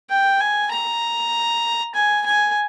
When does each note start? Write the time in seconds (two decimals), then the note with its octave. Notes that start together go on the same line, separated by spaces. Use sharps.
0.10 G5
0.40 G#5
0.72 A#5
1.95 G#5
2.26 G#5